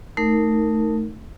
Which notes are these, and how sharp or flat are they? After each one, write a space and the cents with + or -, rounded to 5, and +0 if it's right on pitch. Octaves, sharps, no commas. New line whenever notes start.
A3 +0 D#4 +5 A#4 -15